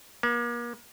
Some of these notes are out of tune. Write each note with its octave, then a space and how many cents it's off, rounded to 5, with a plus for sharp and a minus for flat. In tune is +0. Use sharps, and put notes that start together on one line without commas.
A#3 +40